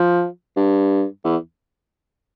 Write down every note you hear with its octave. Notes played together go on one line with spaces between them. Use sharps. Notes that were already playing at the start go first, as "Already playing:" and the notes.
Already playing: F3
G2
E2